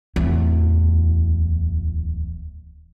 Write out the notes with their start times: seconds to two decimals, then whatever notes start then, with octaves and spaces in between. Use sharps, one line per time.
0.16 D1 E2